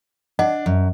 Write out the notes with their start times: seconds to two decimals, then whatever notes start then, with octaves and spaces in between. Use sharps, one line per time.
0.39 D4 D#5 F#5
0.66 F#2